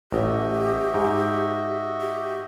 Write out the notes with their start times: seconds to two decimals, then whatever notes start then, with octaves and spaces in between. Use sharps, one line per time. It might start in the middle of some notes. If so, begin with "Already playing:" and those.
0.12 A1 F#4 G4 D#5 E5
0.94 G#2
2.01 G4